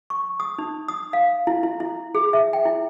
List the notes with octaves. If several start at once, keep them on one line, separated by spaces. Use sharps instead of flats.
C#6
D#6
D#4
D#6
F5
E4
E4
E4
G#4
E5
G5
E4